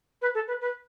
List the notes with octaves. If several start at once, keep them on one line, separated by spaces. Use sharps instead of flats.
B4
A4
B4
B4